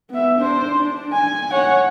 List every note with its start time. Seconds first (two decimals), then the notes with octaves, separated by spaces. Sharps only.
0.10 B3 E5
0.39 D4 C5
0.78 D4
1.13 G#5
1.53 C#5 F#5